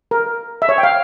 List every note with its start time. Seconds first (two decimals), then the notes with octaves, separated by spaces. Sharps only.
0.11 A#4
0.62 E5
0.69 C#5
0.78 G5
0.83 F5